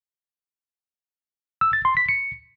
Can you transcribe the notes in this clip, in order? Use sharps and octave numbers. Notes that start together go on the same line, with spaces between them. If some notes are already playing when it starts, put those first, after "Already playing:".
E6
A6
C6
B6
C#7